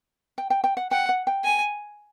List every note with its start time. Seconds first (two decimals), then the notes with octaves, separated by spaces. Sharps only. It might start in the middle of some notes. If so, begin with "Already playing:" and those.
0.38 G5
0.50 G5
0.64 G5
0.77 F#5
0.91 F#5 G5
1.09 F#5
1.27 G5
1.44 G#5